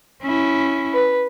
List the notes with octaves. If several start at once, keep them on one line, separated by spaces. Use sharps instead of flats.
C#4 E4
B4